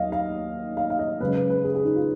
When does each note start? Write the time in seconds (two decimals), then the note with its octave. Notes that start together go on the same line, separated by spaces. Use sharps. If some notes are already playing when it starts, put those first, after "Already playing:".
Already playing: D#2 D#3 F#3 D#5 F5
0.12 F5
0.77 F5
0.90 F5
0.99 D#5
1.20 F#2 C#3 G#3 B4
1.35 B4
1.50 B4
1.64 G#4
1.75 G#4
1.85 D#4
1.96 F4